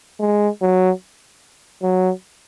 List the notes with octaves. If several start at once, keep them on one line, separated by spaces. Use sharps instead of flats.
G#3
F#3
F#3